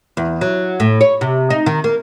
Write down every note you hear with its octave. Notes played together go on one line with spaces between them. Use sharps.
E2
F#3
A2
C#5
C3
D#4
D#3
A#3